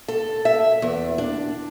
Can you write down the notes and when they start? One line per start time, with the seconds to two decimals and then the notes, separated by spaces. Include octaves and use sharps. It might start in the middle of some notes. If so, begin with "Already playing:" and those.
0.08 A4
0.45 E5
0.82 E2
1.18 D4